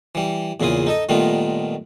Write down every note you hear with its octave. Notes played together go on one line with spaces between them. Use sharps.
E3 G3
E2 A#2 C#3 E4 F4 D#6
D#4 A4 D#5
A#2 D#3 G3 A3 B3 F4